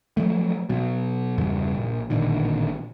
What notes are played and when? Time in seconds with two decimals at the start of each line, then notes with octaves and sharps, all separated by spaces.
0.17 F3 F#3 A3
0.69 B2 F#3
1.38 E2 G2 C#3 E3
1.75 A#1
2.10 A1 A#2 D3 D#3